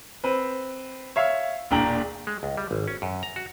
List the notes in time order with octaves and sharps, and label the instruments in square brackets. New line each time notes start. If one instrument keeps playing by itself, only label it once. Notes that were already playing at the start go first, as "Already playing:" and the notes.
[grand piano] C4 B4
C#5 E5 F5
E1 A#2 D4 G5 A#5 F#7
[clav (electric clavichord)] G#3
C#2
G3
G#1
C#4
F#2
A#5
F#4